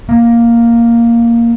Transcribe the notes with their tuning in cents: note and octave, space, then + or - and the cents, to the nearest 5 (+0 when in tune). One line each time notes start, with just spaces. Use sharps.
A#3 +0